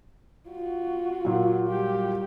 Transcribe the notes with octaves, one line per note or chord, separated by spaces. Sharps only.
F4 F#4
A#2 F#3
G3 G4